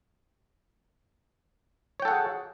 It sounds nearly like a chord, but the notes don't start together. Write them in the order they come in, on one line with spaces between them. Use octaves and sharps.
C#5 G5 A4 F#5 G#4